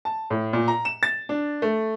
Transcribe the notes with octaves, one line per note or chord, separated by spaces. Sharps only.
A5
A2
A#2
A#5
E7
A6
D4
A3